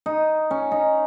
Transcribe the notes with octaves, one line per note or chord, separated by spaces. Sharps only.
D#4
C#4
D#4